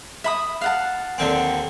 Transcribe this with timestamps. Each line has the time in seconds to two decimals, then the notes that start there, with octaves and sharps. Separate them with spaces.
0.24 E5 B5 D#6
0.61 F5 F#5 A5
1.18 D#2 D3 C4